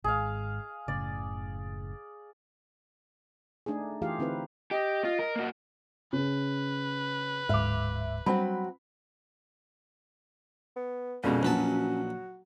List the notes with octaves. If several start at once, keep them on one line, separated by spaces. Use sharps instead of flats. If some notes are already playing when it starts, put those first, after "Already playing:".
G#1 G#2 G#4 F5
F#1 A2 C#3 D5
A3 D4 D#4 G#4
E3 A3 F4 G4 G#4 F5
D3 C4 D#4 E4 B4
G4 D#5
F4
A#4
A#3 F#4
C#3 B4
D1 G#2 E5 F5 D6
F#3 G3 C4 D4 F#5 B5
B3
F2 B2 D3 G#3 C#4
A#1 F#3 F#4 B4 A5